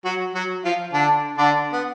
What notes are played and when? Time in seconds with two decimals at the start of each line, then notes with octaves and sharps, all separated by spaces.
0.05 F#3 F#4
0.35 F#3 F#4
0.64 F3 F4
0.93 D3 D4
1.38 D3 D4
1.73 B3